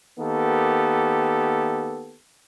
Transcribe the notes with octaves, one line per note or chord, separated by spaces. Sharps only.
D#3 A#3 B3 G4 A4